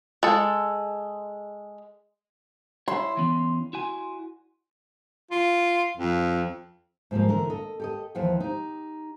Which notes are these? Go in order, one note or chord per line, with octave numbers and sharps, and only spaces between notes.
G#3 A4
E4 C#5 C6
E3 B3 C#4
E4 F#4 G#5
F4
F2
G#2 F3 G3 A#3
D3 E3 A#4
A4 D#5
G4 A4 D#5
D#2 E3 F3 E5 F#5 G5
D#4 G4